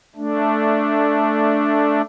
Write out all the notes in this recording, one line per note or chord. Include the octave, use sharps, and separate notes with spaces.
A3 D4